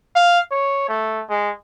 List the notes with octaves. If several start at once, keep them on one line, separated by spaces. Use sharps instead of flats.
F5
C#5
A3
G#3